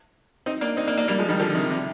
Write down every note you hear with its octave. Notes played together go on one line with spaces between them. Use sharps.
C4 D#4
A#3 D4
C4 D#4
A#3 D4
A#3 D4
G3 A#3
F3 G#3
D#3 G3
D3 F3
C3 D#3
C3